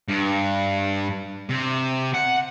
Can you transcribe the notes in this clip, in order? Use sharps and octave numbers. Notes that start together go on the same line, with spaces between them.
G2
C3
F#5